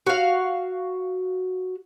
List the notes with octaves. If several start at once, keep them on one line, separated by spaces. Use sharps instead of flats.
F#4 F5